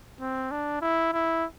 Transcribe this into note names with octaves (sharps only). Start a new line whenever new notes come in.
C4
D4
E4
E4